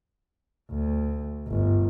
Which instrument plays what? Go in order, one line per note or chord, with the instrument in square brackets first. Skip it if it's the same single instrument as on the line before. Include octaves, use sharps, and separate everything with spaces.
[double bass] D2
G1